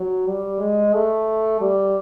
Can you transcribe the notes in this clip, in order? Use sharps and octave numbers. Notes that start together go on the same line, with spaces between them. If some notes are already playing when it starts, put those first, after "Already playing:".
Already playing: F#3
G3
G#3
A3
G3